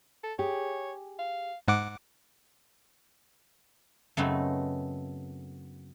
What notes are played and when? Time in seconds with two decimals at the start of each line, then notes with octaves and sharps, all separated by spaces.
0.23 A4
0.39 G4 G#4 C#5
1.19 F5
1.68 G#2 F#5 D6
4.17 F#2 C#3 A3 B3 C4 D#4